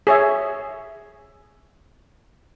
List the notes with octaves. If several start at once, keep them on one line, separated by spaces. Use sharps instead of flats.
G#4 C#5 E5